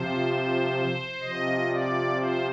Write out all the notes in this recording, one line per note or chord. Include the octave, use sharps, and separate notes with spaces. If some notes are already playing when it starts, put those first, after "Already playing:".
Already playing: C3 F3 C5
C3 F3 D#5
D5
C5